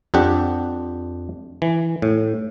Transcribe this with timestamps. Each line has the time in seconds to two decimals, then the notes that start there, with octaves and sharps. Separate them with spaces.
0.14 F2 D4 G4 F#5
1.62 E3
2.02 A2